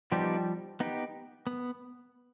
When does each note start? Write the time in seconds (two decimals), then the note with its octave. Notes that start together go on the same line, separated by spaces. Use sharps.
0.12 F3 G3 B3 D#4 G4
0.80 B3 D#4 G4
1.47 B3